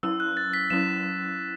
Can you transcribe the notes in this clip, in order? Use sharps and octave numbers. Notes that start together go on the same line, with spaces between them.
F#3 C#4 E4 E6
F#6
A6
B6
F#3 C#4 E4 E7